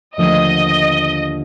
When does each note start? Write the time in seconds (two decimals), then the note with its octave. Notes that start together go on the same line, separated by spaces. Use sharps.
0.17 D#2 D3 F3 A3 D#5